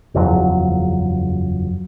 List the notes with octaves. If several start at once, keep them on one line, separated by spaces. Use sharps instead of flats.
F#1 E2 F3 F#3